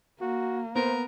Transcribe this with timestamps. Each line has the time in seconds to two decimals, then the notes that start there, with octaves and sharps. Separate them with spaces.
0.21 A#3 F#4
0.76 B3 A#4 C5